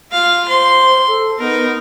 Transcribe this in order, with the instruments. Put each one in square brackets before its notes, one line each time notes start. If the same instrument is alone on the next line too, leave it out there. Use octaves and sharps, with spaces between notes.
[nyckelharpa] F4 F5
[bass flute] C5 [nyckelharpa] C6
[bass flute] A4
[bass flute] B3 [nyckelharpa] D#4 A#4